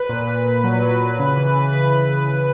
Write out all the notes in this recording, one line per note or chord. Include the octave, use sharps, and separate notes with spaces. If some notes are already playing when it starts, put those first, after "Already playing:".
Already playing: B4
A#2
A#2
A#2
F#3
F#3
F#3
C#3
E3
E3
C#3 B4
C#3
C#3
C#3